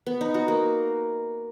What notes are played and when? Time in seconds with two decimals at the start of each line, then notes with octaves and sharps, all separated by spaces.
0.06 B3
0.21 D#4
0.34 F#4
0.48 A#3